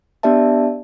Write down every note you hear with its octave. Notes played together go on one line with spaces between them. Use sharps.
B3 D4 G4 D5 E5 A5